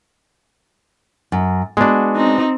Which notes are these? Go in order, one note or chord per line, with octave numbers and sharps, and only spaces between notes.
F#2
G#3 B3 D4 F#4
C4 D#4